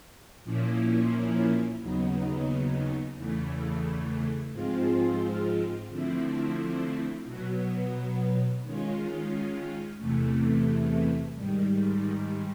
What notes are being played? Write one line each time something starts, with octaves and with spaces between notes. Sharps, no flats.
A#2 F3 A#3 C#4 E4
D#2 C#3 F#3 B3 D#4
E2 C#3 E3 A3
G#2 F3 G#3 C4 F4
D3 F3 A3 C4 E4
B2 F#3 B3
D#3 G#3 C#4 F4
E2 C3 E3 A3
G#2 D#3 G3